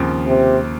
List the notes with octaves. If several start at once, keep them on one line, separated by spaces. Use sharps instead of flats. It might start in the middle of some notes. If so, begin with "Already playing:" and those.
Already playing: D#2 C#3 F3 C4
C3